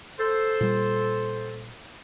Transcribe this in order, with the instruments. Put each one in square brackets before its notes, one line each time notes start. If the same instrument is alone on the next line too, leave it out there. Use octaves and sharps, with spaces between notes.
[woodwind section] A4 C5
[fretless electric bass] A#2 G3